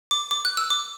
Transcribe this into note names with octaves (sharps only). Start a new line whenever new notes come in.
D6
D6
F#6
E6
D6